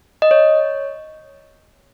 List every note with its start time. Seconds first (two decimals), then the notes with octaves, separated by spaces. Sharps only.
0.22 D#5
0.31 C#5